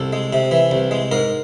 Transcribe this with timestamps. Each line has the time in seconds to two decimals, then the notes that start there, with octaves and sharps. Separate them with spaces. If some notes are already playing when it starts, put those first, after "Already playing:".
Already playing: C2 A4
0.13 G#3
0.33 C3
0.51 E3
0.71 C2
0.91 G#3
1.11 G#2 A#4